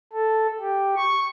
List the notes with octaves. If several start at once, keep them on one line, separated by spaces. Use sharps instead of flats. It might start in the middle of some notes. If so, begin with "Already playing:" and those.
A4
G4
C#6